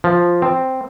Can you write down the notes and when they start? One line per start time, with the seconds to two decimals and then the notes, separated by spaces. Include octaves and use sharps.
0.04 F3
0.42 C4